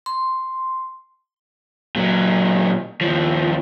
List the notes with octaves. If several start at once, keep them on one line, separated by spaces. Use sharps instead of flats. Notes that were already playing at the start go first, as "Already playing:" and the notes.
C6
A#2 F#3
D#2 F3